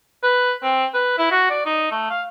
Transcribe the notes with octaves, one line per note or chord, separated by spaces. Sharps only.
B4
C4
B4
E4
F#4
D5
D#4
A3
F5